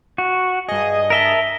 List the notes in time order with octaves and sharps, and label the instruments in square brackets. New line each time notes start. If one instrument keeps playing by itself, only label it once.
[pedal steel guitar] F#4
[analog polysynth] G2 D#5 [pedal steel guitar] G#4
[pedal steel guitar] A#4 E5 A5 [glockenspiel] A#6 B6 G7